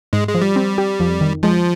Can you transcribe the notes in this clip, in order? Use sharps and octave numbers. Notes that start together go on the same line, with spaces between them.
G#2 G#3
G#3
F3
G3
C4
G4
F2
D#3
F3 G#3